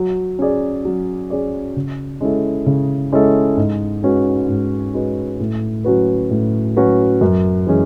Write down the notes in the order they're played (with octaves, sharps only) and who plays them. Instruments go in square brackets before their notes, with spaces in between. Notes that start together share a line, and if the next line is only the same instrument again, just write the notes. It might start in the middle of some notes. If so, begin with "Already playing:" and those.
Already playing: [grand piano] F#3
C#4 G#4 D5
F#3
C#4 G#4 D5
C#3
G#3 C#4 E4 A4
C#3
G#3 C#4 E4 A4
G#2
G#3 C#4 F#4 B4
G#2
G#3 C#4 F#4 B4
A2
F#3 C#4 F#4 B4
A2
F#3 C#4 F#4 B4
F#2
E3 G#3 C#4 G#4